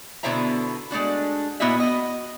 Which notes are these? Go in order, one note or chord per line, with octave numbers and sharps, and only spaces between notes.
B2 D3 E4 C5 E5 A#5
G#3 A3 D4 F#4
A#2 B3 E4 F#4 D#5 E5
F#4 D#5